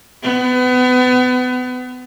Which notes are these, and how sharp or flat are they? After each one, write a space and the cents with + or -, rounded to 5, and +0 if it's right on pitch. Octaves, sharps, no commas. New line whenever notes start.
B3 +30